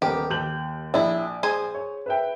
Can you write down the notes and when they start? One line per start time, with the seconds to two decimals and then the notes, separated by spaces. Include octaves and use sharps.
0.02 D#1 B3 G4 A#4
0.30 D#2 G6 F#7
0.94 A#1 D4 E4
1.43 G#4 C5 G#5
1.75 C#5
2.06 B4 E5 G5